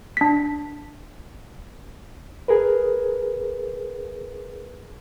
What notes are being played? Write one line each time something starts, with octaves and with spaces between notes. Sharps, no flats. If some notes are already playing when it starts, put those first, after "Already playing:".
D4 B6
G#4 A#4 B4